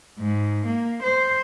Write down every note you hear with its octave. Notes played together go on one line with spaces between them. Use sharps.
G#2
A#3
C5